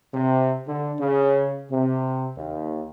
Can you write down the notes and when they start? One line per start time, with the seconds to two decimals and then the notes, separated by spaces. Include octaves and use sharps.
0.14 C3
0.67 D3
0.99 C#3
1.71 C3
2.38 D#2